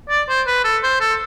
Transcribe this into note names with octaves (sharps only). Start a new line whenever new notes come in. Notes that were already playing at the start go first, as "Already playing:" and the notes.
D5
C5
B4
A4
C5
A4